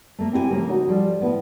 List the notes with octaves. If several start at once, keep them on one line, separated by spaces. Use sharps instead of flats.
A3 A#3
C4 E4 G4 F#5 G#5
C#3 F3 A3 A#3
D#4 F#4 C#5
F3 G3 A4
A2 B3 E4